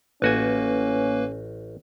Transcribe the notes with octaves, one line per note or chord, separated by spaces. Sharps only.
A1 A#3 C#4 F#4 B4 G#5